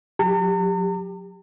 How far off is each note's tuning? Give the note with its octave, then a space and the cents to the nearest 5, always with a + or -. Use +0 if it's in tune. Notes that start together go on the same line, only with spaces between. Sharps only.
F#3 -35 G4 +20 A#5 -45